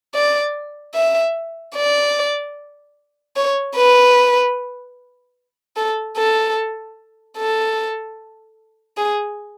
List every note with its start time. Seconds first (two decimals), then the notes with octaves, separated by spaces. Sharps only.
0.15 D5
0.95 E5
1.76 D5
3.36 C#5
3.77 B4
5.77 A4
6.17 A4
7.38 A4
8.97 G#4